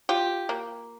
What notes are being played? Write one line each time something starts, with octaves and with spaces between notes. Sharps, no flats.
F4 G4
A#3